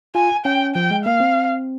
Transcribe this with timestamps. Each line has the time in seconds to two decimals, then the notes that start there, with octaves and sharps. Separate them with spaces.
0.15 F4 G#5
0.45 C#4 G5
0.75 F3 G5
0.91 G#3
1.05 A#3 F5
1.20 C4